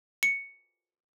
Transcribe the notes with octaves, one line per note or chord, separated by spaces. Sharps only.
C#7